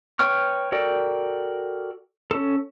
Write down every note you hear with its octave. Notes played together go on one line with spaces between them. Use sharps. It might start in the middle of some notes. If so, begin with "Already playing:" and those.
B4 C#5 G5 C#6 F6
F#4 A4 A#4 D5 G5
C#4 A4